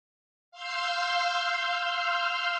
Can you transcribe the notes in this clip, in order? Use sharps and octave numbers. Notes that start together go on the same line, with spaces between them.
F5 C6 E6 F6 G6